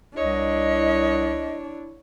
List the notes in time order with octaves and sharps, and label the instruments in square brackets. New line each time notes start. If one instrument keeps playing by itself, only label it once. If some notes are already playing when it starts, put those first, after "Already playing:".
[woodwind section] C2 D#5 [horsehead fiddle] D4 E4 [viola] C#5